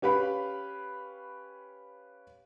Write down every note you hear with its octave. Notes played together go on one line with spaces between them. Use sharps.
C#4 G4 B4 F5 B5